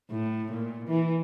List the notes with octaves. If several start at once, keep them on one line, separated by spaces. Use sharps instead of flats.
A2
A#2
E3